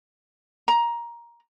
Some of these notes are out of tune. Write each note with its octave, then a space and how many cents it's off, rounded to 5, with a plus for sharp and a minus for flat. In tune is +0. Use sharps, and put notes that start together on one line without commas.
A#5 +15